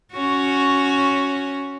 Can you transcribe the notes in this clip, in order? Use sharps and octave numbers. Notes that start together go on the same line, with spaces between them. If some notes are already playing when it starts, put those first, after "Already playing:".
C#4 F#4